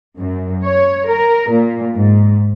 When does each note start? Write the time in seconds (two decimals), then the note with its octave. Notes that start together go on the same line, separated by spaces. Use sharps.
0.17 F#2
0.64 C#5
1.08 A#4
1.50 A#2
1.94 G#2